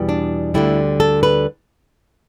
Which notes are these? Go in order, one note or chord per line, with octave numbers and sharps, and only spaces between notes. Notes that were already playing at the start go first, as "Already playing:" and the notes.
Already playing: E2 B2 G3
D4
D2 D3 G3 E4
A4
B4